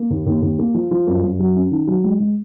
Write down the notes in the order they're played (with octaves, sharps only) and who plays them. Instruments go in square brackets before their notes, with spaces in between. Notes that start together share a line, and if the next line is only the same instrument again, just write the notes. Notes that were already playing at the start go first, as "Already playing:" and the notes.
Already playing: [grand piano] A#3
D#2
D#2
D#2
A#3
F3
F3
F#2
F#2
F#3
C#4
D#3
F#3
G#3
G#3